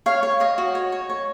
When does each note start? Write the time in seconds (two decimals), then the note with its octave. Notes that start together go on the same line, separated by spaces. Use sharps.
0.06 C#5 F5
0.23 C#5
0.40 C#5 D#5
0.58 F#4
0.75 C#5
0.92 C#5
1.09 C#5